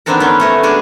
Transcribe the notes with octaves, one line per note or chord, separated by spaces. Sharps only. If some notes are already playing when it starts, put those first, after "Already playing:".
D#3 B3 C4 D4 A4 A#4
B3 C#4
A3 C#5 D#5
G#3 D4 G#4 A4